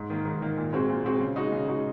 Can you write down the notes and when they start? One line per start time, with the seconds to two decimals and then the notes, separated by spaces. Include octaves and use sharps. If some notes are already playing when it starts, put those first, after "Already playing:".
Already playing: G#2
0.10 D#3 A#3
0.25 G#2
0.42 D#3 A#3
0.57 A#2
0.73 G#3 C4 F#4
0.89 A#2
1.05 G#3 C4 F#4
1.20 C#3
1.36 G#3 D#4 F#4
1.52 C#3
1.68 G#3 D#4 F#4